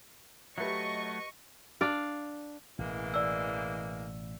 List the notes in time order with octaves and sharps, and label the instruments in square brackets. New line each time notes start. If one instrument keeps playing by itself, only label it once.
[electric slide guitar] F#3 A3 [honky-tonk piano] G4 B4 E5 [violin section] D#5 C#6
[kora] D4 D5 F5
[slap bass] A1 B2 [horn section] E3 G#3 A#3
[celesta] D5 E6